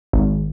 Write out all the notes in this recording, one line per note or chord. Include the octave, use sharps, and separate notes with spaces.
G#1